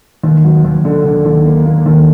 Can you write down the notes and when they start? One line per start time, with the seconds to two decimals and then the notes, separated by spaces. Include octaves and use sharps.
0.24 D#2
0.44 F#3
0.64 D#2
0.85 D3
1.05 D3
1.25 D#2
1.45 A#3
1.66 A#3
1.86 D#2